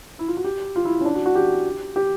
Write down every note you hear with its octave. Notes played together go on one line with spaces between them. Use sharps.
E4
F4
F#4
G4
F4
E4
E4
C#4
D4
F#4
F#4
G4
G4